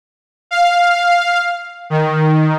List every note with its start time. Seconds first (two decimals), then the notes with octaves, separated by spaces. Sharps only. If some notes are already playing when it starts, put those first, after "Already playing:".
0.51 F5
1.90 D#3